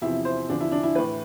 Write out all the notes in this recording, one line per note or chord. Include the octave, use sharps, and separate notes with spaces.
E2 C3 F3 E4
C5
E2 D3 F3 D4
E4
D4
E4
A2 E3 B4